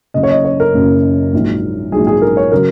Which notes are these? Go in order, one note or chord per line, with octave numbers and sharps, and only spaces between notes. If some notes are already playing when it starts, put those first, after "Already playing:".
F#1 F#2 C#3 D#5
C#5
D#5
C#5
A#4
F#1 F#2 C#3
A#1 G#2 F#3
A#1 G#2 F#3 G#4
G#4
A#4
C#5
C#3 F#3 A#4